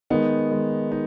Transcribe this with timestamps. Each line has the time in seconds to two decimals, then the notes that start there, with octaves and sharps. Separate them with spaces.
0.10 D#3 G#3 B3 D#4
0.51 D#3 G#3
0.92 D#4